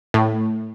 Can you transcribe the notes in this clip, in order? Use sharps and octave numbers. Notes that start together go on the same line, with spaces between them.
A2